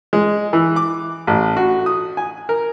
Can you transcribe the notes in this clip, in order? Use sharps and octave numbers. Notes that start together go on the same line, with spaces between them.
G#3
E3
D6
A1
F#4
D#6
G#5
A#4